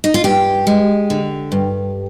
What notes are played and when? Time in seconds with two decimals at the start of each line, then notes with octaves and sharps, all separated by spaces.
0.04 D#4
0.14 F4
0.24 G2 G4
0.67 G#3
1.10 D3
1.52 G2